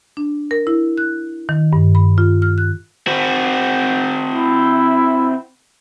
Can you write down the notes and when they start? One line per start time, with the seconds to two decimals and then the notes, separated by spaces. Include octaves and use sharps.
0.17 D4
0.51 A#4
0.67 E4
0.98 F#6
1.49 D#3
1.73 G2
1.95 B5
2.18 F4
2.42 F6
2.58 F#6
3.07 C4 F#4
4.31 E4